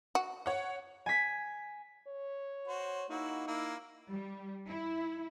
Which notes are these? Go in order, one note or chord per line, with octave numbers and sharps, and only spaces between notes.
F#4
C#5 F#5
G#5 B6
C#5
F#4 C5
A#3 D#4 E4 F#4
A#3 E4
G3
E4